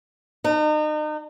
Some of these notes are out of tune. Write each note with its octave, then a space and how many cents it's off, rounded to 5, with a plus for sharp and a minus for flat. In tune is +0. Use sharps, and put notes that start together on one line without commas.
D#4 -35